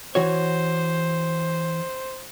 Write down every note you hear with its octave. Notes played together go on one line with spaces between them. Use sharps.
E3 F#4 C5 C#5